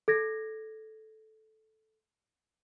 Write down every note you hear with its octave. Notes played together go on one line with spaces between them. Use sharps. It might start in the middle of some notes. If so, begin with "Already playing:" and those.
A4 G#6 A#6